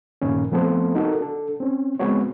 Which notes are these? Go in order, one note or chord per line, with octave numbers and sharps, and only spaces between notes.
G2 A#2 D#3 A#3 C#4
F3 A3 B3 C4 A4 C5
D#4 F#4 A4 A#4
D4 A4
C4 C#4
G#3 B3 C4 F#4 C#5